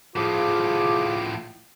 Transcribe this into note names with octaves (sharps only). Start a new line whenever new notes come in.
A2 F3 F4 G#4 D6